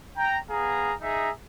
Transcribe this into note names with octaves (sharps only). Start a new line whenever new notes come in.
G5 A#5
B3 G#4 F5 A#5
D#4 G#4 E5 A#5